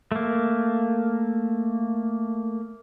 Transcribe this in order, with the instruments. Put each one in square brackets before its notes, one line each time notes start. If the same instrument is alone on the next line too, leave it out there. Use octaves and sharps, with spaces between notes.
[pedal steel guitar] A3 A#3